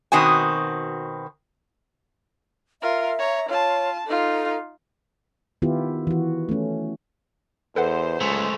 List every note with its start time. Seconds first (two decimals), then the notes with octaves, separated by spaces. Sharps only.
0.12 B2 D#3 C4 F#4 G#5
2.82 F4 A#4 E5
3.19 C#5 A#5
3.49 F4 C#5 A5
4.07 D#4 F4 A4
5.62 D#3 B3 E4 F4 G4
6.07 E3 F#4
6.49 A3 C#4
7.76 E2 A4 B4 C5 F#5
8.21 C#2 G#3 A3